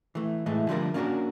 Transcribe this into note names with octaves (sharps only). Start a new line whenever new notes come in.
E3 A3
A2 E3 G#3 A3
D3 F3 G3 F4 F#4 A#4
A#3 C#4 D4 F4 F#4 A#4